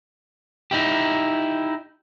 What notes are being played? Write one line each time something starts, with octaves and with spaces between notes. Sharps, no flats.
D#4 E4 G4